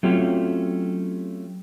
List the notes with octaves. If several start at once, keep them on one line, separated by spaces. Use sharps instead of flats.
F#3 A3 C4 C#4 F4 G4